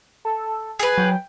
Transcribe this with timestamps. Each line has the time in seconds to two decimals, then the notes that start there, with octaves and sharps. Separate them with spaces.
0.25 A4
0.80 G#4 B4
0.98 F#3 G5